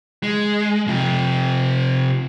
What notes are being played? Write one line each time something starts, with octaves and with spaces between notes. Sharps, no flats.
G#3
C3 F3